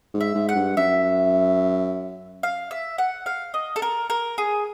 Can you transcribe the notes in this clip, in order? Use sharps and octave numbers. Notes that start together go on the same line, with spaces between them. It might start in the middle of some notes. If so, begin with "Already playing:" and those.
G#2
E5
G#2
F#5
G2
F#2 E5
F5
E5
F#5
F5
D#5
A4
A#4
A#4
G#4